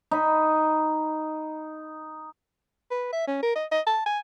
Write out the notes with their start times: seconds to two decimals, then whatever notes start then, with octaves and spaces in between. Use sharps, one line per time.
0.11 D#4 B5
2.91 B4
3.13 E5
3.28 C#4
3.43 A#4
3.55 D#5
3.72 D#5
3.87 A5
4.06 G#5